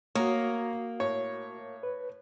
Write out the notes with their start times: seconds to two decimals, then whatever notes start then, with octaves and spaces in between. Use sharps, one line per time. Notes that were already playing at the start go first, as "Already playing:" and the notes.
0.15 A#3 F#4 A#4 C#5 D#6
1.00 A2 C#5
1.83 B4